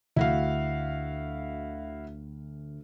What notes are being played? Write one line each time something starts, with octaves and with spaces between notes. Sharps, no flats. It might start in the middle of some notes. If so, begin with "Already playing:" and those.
D2 E4 F#4 F5